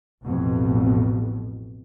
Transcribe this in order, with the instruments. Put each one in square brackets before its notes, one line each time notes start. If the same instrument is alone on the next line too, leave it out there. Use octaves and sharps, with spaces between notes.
[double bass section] A1 F2 B2